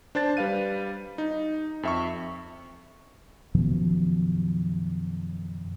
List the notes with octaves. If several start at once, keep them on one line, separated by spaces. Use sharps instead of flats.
D4 C5 A5 A6
G3 B4 F5 D#7
D#4
F2 E5 C#6
F#2 B2 D#3 F3